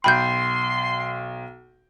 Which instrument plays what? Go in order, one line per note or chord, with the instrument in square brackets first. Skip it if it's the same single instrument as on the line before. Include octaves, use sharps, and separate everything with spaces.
[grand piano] B1 G5 [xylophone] B5 G6 [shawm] C6